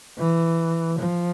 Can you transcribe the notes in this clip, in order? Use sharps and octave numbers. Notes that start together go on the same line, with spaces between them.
E3
F3